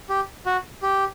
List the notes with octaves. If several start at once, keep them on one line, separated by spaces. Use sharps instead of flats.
G4
F#4
G4